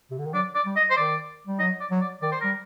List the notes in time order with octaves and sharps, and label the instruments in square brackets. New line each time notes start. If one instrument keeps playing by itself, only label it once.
[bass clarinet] C3
D3
D#3
[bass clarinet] F#3 [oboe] D5
[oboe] D5
[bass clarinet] G3
[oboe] D#5
C5
[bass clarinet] D#3 [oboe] D5
[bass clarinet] G3
[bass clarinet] F#3 [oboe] D#5
[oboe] D5
[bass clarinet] F#3
[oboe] D5
[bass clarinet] D#3 [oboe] D5
[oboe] C5
[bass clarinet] G3 [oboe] A#4